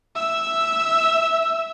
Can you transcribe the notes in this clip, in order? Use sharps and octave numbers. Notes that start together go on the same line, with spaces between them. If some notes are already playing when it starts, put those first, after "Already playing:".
E5 E6